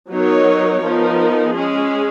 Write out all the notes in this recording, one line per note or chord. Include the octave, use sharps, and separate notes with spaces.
F#3 B3 D#4 A#4 C#5
F3 B3 D#4 A#4
G#3 C#4 G#4